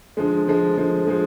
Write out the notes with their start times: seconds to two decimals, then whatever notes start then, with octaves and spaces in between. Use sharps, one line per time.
0.17 D3 F3 G#3
0.47 D3 F3 G#3
0.78 D3 F3 G#3
1.07 F3 G#3